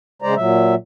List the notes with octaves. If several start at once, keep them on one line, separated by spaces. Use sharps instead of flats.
C#3 G#3 C5 D5 A#5
A#2 F#3 E5